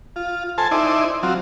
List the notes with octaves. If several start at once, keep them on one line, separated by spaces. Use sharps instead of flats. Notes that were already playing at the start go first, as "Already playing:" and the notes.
F4
A4 C5 G#5 A5
D#4 E4 C5 D5
F#3 C4 F4